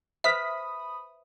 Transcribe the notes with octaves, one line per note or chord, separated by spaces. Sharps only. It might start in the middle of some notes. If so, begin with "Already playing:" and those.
B4 C5 E5 B5 D#6 B6